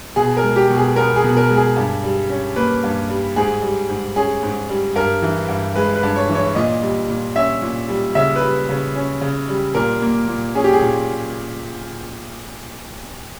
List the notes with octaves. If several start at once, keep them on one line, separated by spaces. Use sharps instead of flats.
B2 G#4
A#4
G#3
G4
B2
G#4
B3 A#4
G#4
B2
A#4
G#3
G#4
G2
G3
C#4
A#3 B4
G2
G3
G#2 G#4
G3
G#2
C#4 G#4
G#2
G3
G2 A#4
E3
G2
G#3 B4
B4
G2
C#5
E3
C#5
A#2 D#5
G3
A#2
C#4 E5
A#2
G3
C#3 E5
B4
G3
C#3
C#4
C#3
G3
A#2 A#4
A#3
A#2
C#4 G#4
G4
G#4
A#2